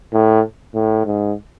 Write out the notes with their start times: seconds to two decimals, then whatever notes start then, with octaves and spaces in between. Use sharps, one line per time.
0.13 A2
0.75 A2
1.05 G#2